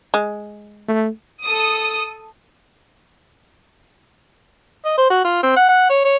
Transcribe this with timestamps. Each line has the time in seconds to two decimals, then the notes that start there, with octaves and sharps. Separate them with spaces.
0.14 G#3
0.88 A3
1.42 A4 D#6
4.85 D#5
4.97 C5
5.10 F#4
5.24 F4
5.43 C4
5.56 F#5
5.69 F#5
5.90 C#5
6.05 C#5